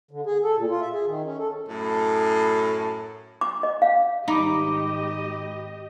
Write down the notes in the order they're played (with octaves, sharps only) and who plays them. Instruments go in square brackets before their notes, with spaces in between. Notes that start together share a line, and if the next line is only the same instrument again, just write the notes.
[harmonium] D3
G#4
A4
A#2
F4
E5
G#4
D#3
C#4
A4
[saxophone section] F#2 A2
[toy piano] D6
D#5
F5
[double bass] G#1 [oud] D#4 [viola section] G4 D#5 [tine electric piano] B5 D6